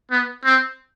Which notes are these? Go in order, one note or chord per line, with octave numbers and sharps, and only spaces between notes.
B3
C4